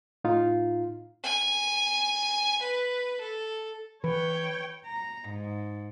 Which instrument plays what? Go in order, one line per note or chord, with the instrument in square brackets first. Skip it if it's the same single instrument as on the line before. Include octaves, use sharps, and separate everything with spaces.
[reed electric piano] A2 D#4 F4 F5
[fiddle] G#5
B4
A4
[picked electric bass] E3 [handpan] B4 [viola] C#5 G5
[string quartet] A#5
G#2